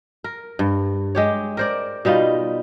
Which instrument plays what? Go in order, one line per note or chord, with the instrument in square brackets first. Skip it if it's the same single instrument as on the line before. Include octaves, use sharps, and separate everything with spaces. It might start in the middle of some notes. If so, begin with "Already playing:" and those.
[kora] A#4
G2
G#3 G4 C#5
A#4 C5 D5
B2 G3 D#4 F4